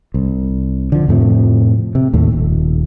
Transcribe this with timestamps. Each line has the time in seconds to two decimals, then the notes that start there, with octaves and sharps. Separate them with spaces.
0.14 C2
0.92 D3 F3
1.08 F2 A2 C3 F3
1.95 C3
2.13 D#2 A2
2.32 D#1